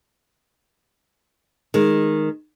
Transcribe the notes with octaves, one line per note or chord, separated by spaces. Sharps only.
D#3 G#3